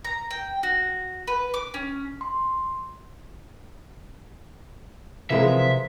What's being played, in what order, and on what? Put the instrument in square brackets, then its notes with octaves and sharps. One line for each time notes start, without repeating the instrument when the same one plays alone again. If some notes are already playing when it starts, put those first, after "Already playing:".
[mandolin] A#5
G5
F#4
B4
D6
C#4
[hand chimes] C6
[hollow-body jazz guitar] C3 A#4 C6 [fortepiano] E3 G#3 A#5 [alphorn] F3 [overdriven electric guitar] E5